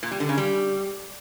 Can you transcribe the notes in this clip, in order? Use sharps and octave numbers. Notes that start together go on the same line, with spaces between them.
A#2
G3
D3
C#3
G3